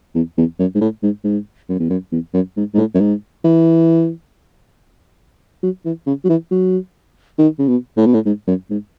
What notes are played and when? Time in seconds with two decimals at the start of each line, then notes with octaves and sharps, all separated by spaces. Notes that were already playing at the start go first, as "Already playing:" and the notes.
0.15 E2
0.38 E2
0.59 F#2
0.75 G#2
0.81 A2
1.03 G#2
1.24 G#2
1.69 F#2
1.80 E2
1.90 F#2
2.12 E2
2.34 F#2
2.57 G#2
2.74 G#2
2.78 A2
2.95 F#2
3.01 G#2
3.44 E3
5.63 F#3
5.85 E3
6.06 C#3
6.25 F#3
6.29 E3
6.51 F#3
7.39 D#3
7.59 C#3
7.68 B2
7.97 A2
8.06 B2
8.14 A2
8.25 G#2
8.47 F#2
8.70 G#2